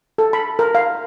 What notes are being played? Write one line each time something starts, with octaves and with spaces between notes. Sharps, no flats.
A4
B5
A#4
F5